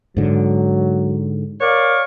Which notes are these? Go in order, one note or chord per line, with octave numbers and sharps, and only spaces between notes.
G#2 D3 F#3
A#4 C#5 D5 F5